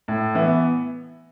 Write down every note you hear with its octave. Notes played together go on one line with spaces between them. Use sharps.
A2
E3 B3 E4